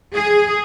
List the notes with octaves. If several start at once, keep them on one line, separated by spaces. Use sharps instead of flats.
G#4